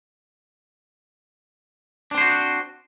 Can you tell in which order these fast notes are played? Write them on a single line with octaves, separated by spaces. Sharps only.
D4 C4 C5 F#4